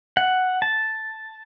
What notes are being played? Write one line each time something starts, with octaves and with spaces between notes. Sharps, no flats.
F#5
A5